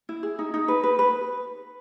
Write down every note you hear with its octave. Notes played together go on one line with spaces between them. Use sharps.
E4
G#4
D#4
D#4
B4
B4
B4